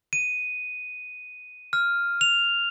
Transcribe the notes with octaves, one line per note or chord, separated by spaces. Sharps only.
D#7
F6
F7